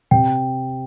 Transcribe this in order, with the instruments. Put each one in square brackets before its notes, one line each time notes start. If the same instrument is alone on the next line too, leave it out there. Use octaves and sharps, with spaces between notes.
[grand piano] C3 [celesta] G5